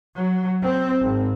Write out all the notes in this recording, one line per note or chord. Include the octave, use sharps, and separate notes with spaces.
F#3
C4
G#1